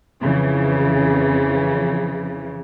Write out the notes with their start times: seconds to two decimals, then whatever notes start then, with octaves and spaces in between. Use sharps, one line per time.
0.21 F2 C#3 E3